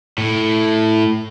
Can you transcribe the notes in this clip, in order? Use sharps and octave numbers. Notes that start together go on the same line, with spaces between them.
A2